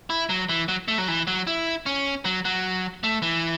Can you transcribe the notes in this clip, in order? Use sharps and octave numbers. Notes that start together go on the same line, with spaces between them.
E4
F#3
E3
F#3
A3
F#3
E3
F#3
E4
C#4
F#3
F#3
A3
E3